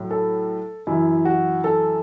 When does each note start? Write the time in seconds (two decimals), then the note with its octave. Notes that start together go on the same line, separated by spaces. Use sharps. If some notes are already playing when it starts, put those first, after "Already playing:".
Already playing: A2 F#3
0.11 A4
0.87 F#2 E3 E4
1.25 F#4
1.64 A4